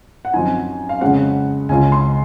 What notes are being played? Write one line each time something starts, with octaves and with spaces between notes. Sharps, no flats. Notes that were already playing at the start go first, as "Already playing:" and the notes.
F#5
F#2 F3 C4 D#4 G#5
F5
F2 C#3 G#3 C#4 F#5
C#2 C#3 G#3 C#4 F4 G#5
C6